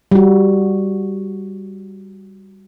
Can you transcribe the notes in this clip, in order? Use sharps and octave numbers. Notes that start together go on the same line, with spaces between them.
G3 F#4